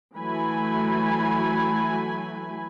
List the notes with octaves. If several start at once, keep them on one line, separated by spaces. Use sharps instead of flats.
E3 F#3 A3 G#5 B5